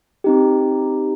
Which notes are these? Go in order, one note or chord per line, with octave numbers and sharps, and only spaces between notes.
C4 D#4 G4